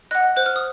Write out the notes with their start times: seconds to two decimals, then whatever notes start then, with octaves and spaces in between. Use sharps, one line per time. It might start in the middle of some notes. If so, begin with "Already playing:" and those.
0.11 D#5 F#5 F#6
0.36 C5 F#6
0.46 F6
0.56 D#6